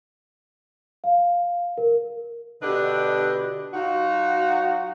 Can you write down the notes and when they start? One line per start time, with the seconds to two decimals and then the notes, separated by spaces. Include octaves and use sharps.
1.04 F5
1.78 A#4
2.62 B2 D3 D4 G4 B4 D#5
3.74 F#3 D#4 F4 F#4